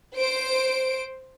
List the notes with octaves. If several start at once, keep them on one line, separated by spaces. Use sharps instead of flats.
C5 D7